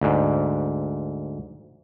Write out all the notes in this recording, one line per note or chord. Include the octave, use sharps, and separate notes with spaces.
D2 G#2